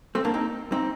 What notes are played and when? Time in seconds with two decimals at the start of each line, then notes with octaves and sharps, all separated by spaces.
0.15 A3 C4
0.25 A#3 D4
0.34 C4 D#4
0.72 C4 D#4